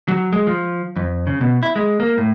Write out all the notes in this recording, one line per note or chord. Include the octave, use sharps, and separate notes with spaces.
F#3
G#3
F3
F2
C#3
B2
E4
G#3
A#3
A2